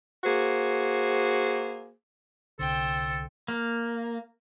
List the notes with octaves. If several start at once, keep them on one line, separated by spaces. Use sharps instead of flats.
A#3 F#4 G#4 C5
C2 D3 A4 C5 G5
A#3